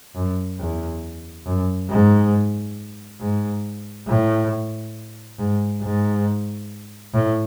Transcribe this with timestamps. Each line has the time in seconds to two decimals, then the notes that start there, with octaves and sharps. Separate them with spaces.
0.15 F#2
0.59 E2
1.46 F#2
1.90 G#2
3.21 G#2
4.08 A2
5.39 G#2
5.82 G#2
7.14 A2